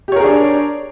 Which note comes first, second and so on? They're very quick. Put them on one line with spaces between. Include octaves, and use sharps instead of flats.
G4 C#5 A#4 G#4 D4